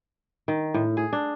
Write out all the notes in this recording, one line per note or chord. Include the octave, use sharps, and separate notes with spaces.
D#3
A2
G#4
D4